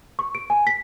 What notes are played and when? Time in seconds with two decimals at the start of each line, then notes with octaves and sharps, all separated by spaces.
0.19 C#6
0.35 D7
0.50 G#5
0.67 B6